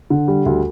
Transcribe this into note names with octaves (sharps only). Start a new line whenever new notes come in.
D3
G3
D2